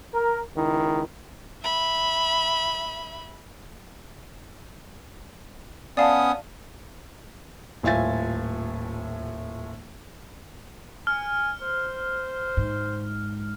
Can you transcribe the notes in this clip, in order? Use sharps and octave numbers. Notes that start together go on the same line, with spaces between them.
A#4
C#2 D#3 E4
E5 B5
B3 C#4 D5 F5 A5 D#6
D#1 A2 F4 E5 G#5 A6
G#5 F6
C5
G#2